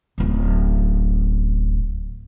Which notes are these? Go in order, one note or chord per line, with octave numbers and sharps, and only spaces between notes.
D1 A1